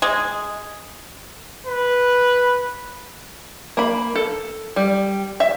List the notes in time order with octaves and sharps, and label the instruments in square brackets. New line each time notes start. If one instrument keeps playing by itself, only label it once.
[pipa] G#3
[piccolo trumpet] B4
[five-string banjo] A#3 B5
A4
G3
E5